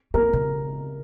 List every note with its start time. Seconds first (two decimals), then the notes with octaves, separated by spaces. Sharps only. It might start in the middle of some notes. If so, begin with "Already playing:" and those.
0.14 A#3 A#4
0.33 C#3